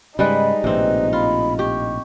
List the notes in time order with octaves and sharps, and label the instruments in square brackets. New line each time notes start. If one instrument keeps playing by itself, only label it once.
[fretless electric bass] G#2 C#3 [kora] G3 G#3 B4 [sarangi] D#4 [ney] B5
[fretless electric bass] A#1 A2 [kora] C3 C4 [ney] B4
[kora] F4 [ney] B5
[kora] G4 [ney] C#6